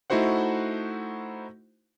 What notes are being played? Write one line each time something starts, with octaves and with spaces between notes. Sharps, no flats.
A3 D#4 E4 F#4 C5 F#5